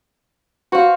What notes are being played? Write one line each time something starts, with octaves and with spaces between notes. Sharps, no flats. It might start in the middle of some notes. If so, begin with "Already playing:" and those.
F#4 C5 F5